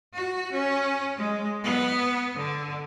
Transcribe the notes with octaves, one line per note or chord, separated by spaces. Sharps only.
F#4
C#4
G#3
B3
D3